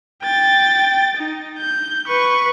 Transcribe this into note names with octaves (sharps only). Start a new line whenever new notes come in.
G5 A6
D#4
G6
B4 C#6